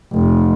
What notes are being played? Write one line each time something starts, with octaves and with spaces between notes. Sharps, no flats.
F1